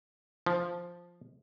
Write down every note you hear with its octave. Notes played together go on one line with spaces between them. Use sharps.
F3